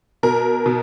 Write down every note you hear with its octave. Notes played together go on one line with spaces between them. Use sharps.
B2 A#4
B2